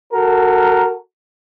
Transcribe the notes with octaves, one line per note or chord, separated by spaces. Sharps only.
F#4 A4 A#4